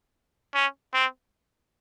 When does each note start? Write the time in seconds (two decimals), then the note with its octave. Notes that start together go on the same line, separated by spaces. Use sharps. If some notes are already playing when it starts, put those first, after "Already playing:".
0.54 C#4
0.94 C4